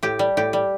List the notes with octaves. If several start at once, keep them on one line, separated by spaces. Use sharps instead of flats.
A2 G4
G3
A2 G4
G3